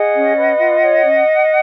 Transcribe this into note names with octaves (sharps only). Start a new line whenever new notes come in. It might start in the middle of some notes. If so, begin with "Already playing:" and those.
Already playing: G#4 D#5 F#5
C#4
B4
F4
C#5
C#4